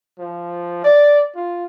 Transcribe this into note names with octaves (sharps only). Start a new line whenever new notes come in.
F3
D5
F4